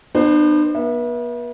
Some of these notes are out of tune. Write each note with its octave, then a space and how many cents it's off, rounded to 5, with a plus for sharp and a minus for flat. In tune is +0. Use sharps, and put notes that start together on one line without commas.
B3 +0 D4 +45 C5 +0
B3 -40 E5 +0